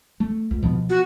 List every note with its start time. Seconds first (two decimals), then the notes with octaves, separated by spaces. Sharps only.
0.20 A3
0.51 C#2
0.63 B2 F3 B3
0.90 F#4